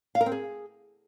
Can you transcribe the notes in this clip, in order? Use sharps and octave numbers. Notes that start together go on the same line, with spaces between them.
F5
A#4
C4
G#4